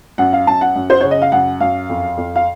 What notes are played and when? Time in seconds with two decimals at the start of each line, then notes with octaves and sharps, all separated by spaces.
0.18 F#2 F#5
0.33 F5
0.47 F#2 A5
0.61 F#5
0.76 F#2
0.90 C5
1.01 C#3 C#5
1.11 D#5
1.22 F5
1.32 F#2 F#5
1.60 F#2 F5
1.89 F2
2.17 F2
2.36 F5